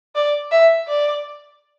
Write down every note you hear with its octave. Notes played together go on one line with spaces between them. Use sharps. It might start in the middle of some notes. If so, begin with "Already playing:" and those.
D5
E5
D5